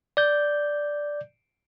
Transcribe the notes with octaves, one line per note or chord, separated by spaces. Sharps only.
D5 G6